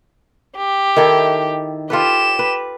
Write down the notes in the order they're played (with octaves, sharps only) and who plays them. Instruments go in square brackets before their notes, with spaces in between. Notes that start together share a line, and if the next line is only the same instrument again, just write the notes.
[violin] G4
[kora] D#3 E4 A4
[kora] F4 A4 B4 [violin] G4 E7
[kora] B4